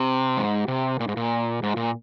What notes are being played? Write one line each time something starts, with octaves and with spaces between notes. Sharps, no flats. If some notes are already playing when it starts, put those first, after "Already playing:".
Already playing: C3
G#2
C3
A#2
G#2
A#2
G#2
A#2